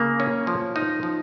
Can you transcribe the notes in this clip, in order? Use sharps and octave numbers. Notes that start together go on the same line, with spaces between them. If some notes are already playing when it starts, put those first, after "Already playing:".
Already playing: C#3 A#3
C#4
F3
D#4
F3